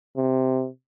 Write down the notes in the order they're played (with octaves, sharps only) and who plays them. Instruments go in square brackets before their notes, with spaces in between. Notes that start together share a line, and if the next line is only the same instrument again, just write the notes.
[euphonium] C3